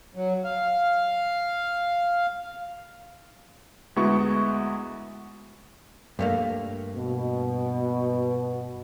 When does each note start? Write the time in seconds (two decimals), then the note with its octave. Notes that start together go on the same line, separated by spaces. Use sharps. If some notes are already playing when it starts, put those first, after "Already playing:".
0.16 F#3
0.44 F5
3.96 D2 G#3 B3 E4 F#4 C#6
6.19 G2 A3 A#3
6.96 B2